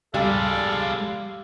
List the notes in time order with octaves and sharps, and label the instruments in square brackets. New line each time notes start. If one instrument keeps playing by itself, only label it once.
[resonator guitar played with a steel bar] G3 [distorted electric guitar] G#3 D5 [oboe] A4 [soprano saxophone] F5